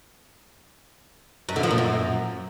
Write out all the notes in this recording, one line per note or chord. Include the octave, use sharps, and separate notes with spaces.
F#2
D3
F3
A#2
F#2